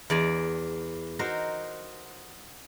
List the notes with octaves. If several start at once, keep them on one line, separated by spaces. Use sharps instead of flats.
E2 D5 G#5 A#5
D#4 F#4 A#4 C5